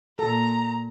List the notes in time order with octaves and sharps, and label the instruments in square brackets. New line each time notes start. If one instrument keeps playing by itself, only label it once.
[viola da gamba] A#2 [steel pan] A4 [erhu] A#5